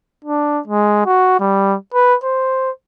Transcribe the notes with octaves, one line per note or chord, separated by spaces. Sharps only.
D4
G#3
F#4
G3
B4
C5